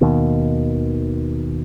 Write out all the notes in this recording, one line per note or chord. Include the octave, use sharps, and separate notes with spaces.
D#2 B2 D#3